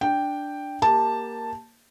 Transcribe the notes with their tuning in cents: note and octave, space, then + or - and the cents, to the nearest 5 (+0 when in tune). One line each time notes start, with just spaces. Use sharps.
D4 +0 G5 +0
A#3 +0 G4 +10 A5 +0